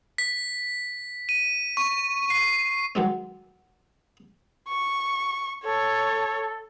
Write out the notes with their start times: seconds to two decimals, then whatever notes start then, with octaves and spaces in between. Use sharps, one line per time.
0.18 B6
1.29 D#7
1.77 C#6
2.30 C7
2.95 D#3 F#3 G#3 C4
4.69 C#6
5.64 A4 C#5